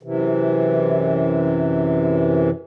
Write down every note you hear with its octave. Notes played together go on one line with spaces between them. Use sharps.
F#2 C3 E3